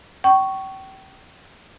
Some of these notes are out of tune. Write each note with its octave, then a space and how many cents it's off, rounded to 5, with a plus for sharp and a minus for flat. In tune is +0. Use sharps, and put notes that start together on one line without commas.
G5 -35 C#6 +0